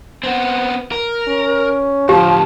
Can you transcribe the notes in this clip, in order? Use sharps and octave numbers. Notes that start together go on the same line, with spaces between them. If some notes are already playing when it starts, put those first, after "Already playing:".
B3 C4
A#4
C#4
A2 D3 F3 G4 A5